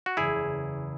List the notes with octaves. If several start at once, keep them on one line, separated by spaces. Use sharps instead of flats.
F#4
F#1 E2 C#3 E3 G#3 E4 G#4